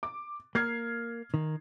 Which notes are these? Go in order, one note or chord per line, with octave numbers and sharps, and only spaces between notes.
D6
A#3 F6 G#6 C7
D#3